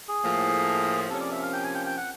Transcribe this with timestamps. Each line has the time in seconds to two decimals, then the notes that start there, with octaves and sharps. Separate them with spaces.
0.09 G#4
0.22 A2 F3 A#3
1.10 C3 F3 A#3 C#4 A4
1.20 D5
1.32 E5
1.42 F5
1.53 G5
1.64 G#5
1.75 G5
1.86 G5
1.97 F#5